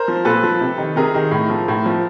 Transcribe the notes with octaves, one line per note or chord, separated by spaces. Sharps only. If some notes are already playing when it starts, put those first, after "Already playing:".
Already playing: A#4 C5
F3
A#2 A4 B4
F3
C3
D#3
C3 G#4 A#4
D#3
A2
F3
A2
F3